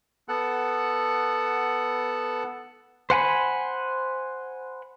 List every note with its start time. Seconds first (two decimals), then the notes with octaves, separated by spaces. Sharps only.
0.28 B3 A4 F#5
3.10 C5 F#5 G#5 B5